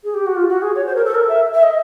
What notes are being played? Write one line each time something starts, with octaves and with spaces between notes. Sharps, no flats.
G#4
G4
F#4
F4
F#4
G#4
C#5
C5
A#4
A4
A#4
E5
E5
D#5